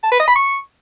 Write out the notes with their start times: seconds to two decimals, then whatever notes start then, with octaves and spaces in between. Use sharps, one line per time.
0.04 A5
0.12 B4
0.20 D#5
0.28 B5
0.36 C#6